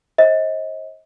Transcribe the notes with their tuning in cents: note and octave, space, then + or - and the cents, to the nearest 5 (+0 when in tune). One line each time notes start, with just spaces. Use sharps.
C5 +40 D#5 +35